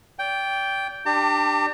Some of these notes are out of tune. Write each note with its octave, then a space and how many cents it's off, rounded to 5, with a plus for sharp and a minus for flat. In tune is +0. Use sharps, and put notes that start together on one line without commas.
D5 -35 G5 +0
D4 +20 G4 +0 A5 +45